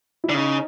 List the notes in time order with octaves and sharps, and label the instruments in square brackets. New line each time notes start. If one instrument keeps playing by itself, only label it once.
[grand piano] E4
[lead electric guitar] D3
[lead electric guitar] C#3 [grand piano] D#4